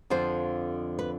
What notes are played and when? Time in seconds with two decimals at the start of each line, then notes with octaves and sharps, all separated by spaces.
0.10 F2 D3 F3 C5
0.99 B4